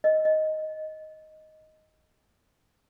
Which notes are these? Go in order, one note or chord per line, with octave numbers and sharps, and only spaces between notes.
D#5
D#5